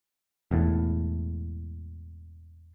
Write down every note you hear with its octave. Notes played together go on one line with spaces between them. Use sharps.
E1 E2 A2